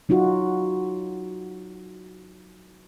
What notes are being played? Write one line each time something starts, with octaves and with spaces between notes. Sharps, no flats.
F#3 D#4 F4 F#4